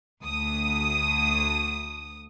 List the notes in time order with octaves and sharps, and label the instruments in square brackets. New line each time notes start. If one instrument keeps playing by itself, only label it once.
[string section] D2 D#6